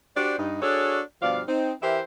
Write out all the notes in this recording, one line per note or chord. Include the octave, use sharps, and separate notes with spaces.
D4 F#4 G4 C5 D5
G2 D#4
D4 F#4 G#4 A4 C#5 D5
G2 B2 F3 D5 F5
C4 D#4
E3 G4 A#4 C5 E5